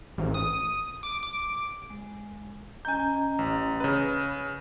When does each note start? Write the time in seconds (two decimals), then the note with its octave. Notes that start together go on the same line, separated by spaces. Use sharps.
0.18 A1
0.34 D#6
1.03 D6
1.23 D6
1.90 G#3
2.85 C#4 D#5 G#5 A#5 G6
3.39 A1
3.80 C#3 B4